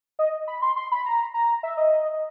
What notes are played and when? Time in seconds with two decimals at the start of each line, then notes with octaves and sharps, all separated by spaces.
0.19 D#5
0.48 B5
0.62 C6
0.76 C6
0.92 B5
1.06 A#5
1.34 A#5
1.63 E5
1.77 D#5